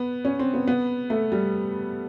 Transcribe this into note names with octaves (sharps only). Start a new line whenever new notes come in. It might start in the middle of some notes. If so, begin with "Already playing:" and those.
Already playing: B3
C#4
C4
B3
B3
A3
G3